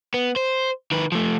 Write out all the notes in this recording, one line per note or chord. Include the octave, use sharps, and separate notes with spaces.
B3
C5
D#3 B4
F3 A3